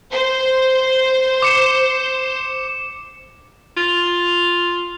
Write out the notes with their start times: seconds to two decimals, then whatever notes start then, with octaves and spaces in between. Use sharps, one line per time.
0.12 C5
1.42 D6 C#7 E7
3.77 F4